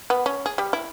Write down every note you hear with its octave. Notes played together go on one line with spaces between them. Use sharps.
B3
C#4
G#4
G3
E4